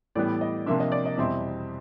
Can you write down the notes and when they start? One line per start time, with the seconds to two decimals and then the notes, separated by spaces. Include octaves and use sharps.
0.15 A2 E3 G3 B3 D5
0.41 D#5
0.66 C3 F3 A#3 D4 E5
0.80 D#5
0.92 D5
1.05 D#5
1.17 E2 B2 G3 C4 E5